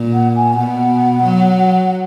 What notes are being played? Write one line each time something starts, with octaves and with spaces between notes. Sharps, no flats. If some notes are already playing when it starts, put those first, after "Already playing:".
Already playing: A#2
F#5
G#5
B2 F#5
F#3